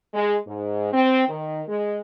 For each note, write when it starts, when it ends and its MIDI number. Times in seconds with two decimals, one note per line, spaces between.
0.14 0.36 56
0.46 0.89 44
0.93 1.25 60
1.29 1.61 51
1.68 2.00 56